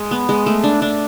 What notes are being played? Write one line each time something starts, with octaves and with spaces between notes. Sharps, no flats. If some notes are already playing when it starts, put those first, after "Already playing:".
Already playing: G#3
B3
G#3
A3
D4
D4